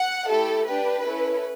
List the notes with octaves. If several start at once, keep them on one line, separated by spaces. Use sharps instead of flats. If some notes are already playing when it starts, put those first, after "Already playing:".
Already playing: F#5
A3 E4 G4 A4
D4 G4 B4
C#4 E4 A4